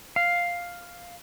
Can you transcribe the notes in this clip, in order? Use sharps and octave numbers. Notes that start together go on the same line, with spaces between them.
F5